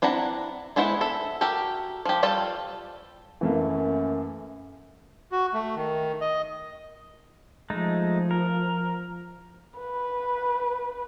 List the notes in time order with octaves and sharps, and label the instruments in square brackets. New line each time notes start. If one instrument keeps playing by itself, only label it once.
[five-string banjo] C4 D4 E4 F#5 A#5
G#3 B3 E4 C5 F#5
A4 E5
F#4 G4 A4 A#4 G5
F3 G4
G3 F4 A4 G5 A5
[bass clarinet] F#2 [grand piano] E3 A3 A#3
[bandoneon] F#4
A3
D#3
D#5
[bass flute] F3 [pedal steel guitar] G#3 A3 D#4
[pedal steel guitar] A#4
[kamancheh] B4